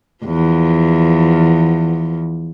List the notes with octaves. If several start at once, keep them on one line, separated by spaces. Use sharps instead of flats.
E2 F3